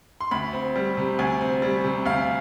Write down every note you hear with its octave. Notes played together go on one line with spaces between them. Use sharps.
C6
D2 B5
C4
G3
C3
D2 G#5
C4
G3
C3
D2 F5